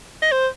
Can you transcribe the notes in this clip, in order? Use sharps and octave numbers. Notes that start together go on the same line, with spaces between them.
D#5
C5